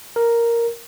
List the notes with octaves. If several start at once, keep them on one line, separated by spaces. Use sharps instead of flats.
A#4